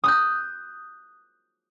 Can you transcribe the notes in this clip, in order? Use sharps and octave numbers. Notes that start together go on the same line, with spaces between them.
D#6 F#6 G6